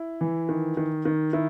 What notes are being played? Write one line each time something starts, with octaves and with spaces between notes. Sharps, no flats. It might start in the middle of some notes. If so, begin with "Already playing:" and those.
Already playing: E4
E3
D#3
D#3
D#3
D#3 E4